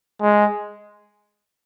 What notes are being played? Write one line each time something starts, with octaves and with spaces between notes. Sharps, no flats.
G#3